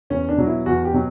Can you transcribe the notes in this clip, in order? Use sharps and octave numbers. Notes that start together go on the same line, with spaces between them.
E2 C#4
D4
B2 F#3
E4
E2 F#4
G4
B2 F#3